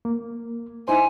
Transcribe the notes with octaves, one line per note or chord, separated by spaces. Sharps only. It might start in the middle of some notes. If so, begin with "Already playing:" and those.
A#3
D#4 E4 C5 G#5